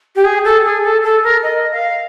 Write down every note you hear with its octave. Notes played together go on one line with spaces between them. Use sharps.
G4
G#4
A4
G#4
A4
A4
A#4
D#5
F5